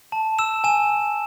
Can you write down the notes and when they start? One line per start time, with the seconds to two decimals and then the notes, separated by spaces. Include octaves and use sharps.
0.12 A5
0.39 E6 E7
0.64 G#5 E7